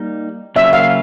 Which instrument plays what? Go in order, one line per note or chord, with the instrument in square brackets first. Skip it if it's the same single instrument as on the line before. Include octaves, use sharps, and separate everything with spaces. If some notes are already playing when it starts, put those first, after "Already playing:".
Already playing: [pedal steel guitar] G3 A#3 D#4
[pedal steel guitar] C#3 F#3 A#3 C#4 F4 [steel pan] E5
[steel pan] F5